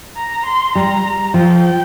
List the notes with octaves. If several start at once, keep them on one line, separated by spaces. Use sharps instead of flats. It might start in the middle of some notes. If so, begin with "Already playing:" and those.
A#5
C6
G3 A#5
F3 G5